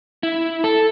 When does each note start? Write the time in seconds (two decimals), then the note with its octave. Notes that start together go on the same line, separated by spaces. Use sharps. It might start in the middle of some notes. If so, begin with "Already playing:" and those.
0.23 E4
0.64 A4